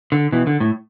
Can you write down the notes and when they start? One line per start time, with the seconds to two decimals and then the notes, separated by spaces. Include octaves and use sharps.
0.12 D3
0.32 B2 E3
0.47 D3
0.60 A2